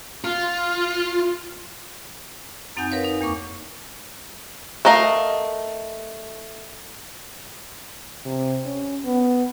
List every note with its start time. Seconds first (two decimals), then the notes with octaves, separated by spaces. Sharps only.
0.24 F4
2.77 F#2 C4 D#4 F#5 G#5 G6
2.91 A#4 B4 C#5 F5
3.04 D#4
3.21 E2 A#3 C#6 D6
4.85 A3 A#4 D#5 F5
8.26 C3
8.65 C#4
9.05 B3